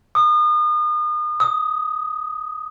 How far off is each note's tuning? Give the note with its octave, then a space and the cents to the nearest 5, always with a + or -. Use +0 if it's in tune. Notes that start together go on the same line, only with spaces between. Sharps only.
D#6 -35
D#6 +15